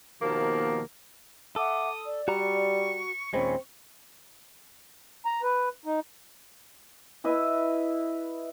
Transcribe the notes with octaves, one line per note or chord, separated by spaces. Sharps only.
D#2 B2 D#3 F3 A#3
A4 E5 F#5 D6 D#6
D5
G3 F#4 A#5 C#6
D#2 A#2 G#3 C4 C#4 B5
A#5
B4
D#4
E4 B4 D#5 E5